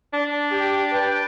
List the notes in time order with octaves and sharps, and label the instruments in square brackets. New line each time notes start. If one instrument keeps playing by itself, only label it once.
[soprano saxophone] D4
[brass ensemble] G4
B4 G5